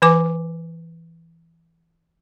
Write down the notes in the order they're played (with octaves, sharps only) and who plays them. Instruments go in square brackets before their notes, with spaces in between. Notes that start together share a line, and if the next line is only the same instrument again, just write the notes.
[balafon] E3 B4 G#5 D6